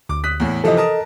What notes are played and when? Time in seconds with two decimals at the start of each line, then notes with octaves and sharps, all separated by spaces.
0.09 D2 D6
0.24 D#6 F#6 B6
0.40 E2 A2
0.64 C3 E3 F3 A4 D#5
0.77 A#4 A5 D#6